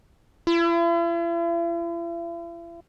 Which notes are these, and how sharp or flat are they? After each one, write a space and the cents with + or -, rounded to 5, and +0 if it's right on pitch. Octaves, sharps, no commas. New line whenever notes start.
E4 +45